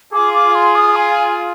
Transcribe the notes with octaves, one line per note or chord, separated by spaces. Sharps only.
F4 G#4 D6
D6
C6
D#6
G#5